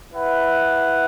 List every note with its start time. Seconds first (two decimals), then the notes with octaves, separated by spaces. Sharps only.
0.12 E4 B4 F#5